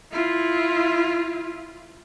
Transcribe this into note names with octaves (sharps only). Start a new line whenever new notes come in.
E4 F4